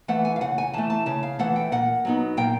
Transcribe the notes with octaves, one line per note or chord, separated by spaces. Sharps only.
E3 A3 F#5
G#5
F5
C#3 F#5
G#5
E3 A3 A5
A5
C#3 A5
F5
E3 A3 F#5
G5
A#2 F#5
F#3 B3 D#4
A#2 G5